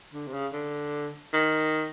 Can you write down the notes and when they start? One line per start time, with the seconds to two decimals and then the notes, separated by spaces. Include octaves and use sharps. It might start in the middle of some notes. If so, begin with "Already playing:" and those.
0.14 D3
0.27 C3
0.33 C#3
0.53 D3
1.33 D#3